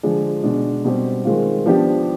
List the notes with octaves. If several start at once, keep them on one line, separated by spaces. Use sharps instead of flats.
D3 F3 G#3 D4 G#4
B2 G#3 D4
B2 G3 C4 G4
D#3 G#3 C4 F4
F3 B3 D4 G4